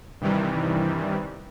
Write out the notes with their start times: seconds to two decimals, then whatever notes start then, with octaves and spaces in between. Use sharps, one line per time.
0.21 G2 C3 D#3 E3 G3